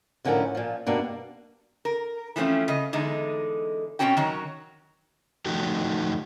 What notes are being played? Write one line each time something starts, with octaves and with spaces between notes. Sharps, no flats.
A2 D3 F3 C#4 E4 A#4
A#2 F3
G2 B2 A#3 D4
A#4
E3 F3 A3 C4 C#4
C#3 D#5
E2 D3 G#3 D#4
B2 E3 C4 C#4 F#4 G5
D#3 F#3 F#4
D#3 F3 A3 D#4 F#4 G4